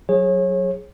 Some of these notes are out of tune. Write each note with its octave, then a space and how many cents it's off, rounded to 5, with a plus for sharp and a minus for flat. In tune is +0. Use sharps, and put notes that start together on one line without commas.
F#3 +0 G#4 +0 C#5 -30